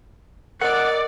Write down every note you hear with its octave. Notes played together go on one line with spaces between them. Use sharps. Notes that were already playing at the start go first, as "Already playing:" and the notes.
A#4 D5 D#5 F#5